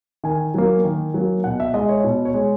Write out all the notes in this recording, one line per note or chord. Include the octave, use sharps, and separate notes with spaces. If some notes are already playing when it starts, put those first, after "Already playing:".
D#3 G#5
F#3 A#3
D#3
F#3 A#3
B2 F#5
E5
G#3 D#5
C#5
B2
C#5
G#3